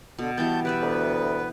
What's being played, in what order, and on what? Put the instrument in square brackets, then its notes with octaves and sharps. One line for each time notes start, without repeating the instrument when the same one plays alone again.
[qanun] B2 [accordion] D3
[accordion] B2 A5 G6 [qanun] E3 G3 B3
[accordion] B3 B4 [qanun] G4 D5 E5
[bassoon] D2